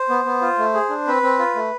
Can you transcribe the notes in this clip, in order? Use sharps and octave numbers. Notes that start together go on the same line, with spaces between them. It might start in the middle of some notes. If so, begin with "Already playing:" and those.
Already playing: C5
B3
B3
F4
A3
G#4
D4
C4 B4
C4
F4
A3